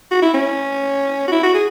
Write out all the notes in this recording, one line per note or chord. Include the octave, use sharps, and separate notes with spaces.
F#4
E4
C#4
F#4
E4
F#4
G#4